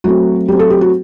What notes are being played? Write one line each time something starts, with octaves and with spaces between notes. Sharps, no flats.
F#3 A3 C4 F#4
F#3 A3 C4 G4
A4
G4
F#4